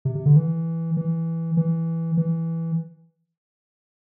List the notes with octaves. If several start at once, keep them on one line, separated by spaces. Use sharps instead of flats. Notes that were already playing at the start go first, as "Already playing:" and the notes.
C3
C3
D3
E3
E3
E3
E3